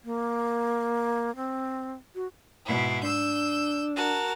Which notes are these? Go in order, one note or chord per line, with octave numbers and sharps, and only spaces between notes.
A#3
C4
F#4
G#2 B2 E4
D4 E6 G6
F#4 A#4 A5